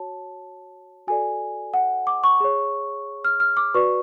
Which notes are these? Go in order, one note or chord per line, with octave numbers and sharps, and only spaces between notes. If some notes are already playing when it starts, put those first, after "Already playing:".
Already playing: F#4 C#5 A5
F#4 A4 D5 G#5
F#5
D6
C#6
G#4 C#5
F6
F6
D6
F#4 B4 D5 C#6